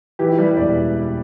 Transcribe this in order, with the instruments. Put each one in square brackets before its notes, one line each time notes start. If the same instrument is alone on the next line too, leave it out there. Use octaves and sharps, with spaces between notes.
[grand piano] E3 G4
E4
G3 B4
E1 D5